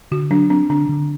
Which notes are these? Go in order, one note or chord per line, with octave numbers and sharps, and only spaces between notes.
D3 F#4
F#3 D4
C4 D4
D3 D4
D3